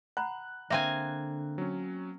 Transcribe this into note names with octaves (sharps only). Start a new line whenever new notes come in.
F#5 A#5 B5 F#6
D3 A#3 C4 E5 G#5
F#3 C#4